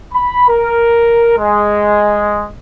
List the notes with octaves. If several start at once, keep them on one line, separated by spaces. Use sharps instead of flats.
B5
A#4
G#3